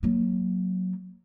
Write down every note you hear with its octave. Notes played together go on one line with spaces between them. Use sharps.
F#3 A#3